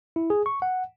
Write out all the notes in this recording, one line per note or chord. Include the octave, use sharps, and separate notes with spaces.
E4
G#4
C#6
F#5